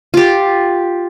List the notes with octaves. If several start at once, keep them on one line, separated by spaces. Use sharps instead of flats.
F4 G4